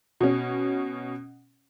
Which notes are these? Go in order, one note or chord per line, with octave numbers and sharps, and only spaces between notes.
B2 C#4